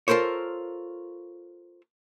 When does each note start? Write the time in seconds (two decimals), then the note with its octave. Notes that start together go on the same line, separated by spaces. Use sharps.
0.08 F4 A4 A#4 C5 C#5